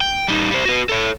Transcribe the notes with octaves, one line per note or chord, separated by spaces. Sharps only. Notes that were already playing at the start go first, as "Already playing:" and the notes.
G5
G3 D#4
G3 C5
F#4 B4
A4 C#5